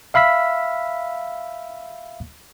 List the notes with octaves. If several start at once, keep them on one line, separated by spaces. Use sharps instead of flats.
E5 F5 B5 E6 B6